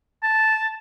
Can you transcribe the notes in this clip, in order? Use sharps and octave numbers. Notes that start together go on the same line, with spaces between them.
A5